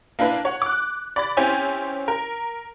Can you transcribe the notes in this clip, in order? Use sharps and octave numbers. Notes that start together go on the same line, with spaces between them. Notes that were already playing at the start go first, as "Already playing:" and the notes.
A#3 D4 E4 B4
C#5 F#5
D6 F#6
D5 B5 A6
C4 C#4 E4 G4 G#5 C6
A#4